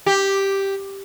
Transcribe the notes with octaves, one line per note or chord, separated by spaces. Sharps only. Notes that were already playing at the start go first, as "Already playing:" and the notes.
G4